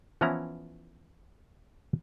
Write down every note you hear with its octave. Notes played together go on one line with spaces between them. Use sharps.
E3 F3 B3 C#4 E4 A#5